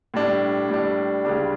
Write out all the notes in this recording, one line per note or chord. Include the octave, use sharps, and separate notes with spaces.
A2 G3 D4
A2 G3 D4
C#2 C#3 G3 D4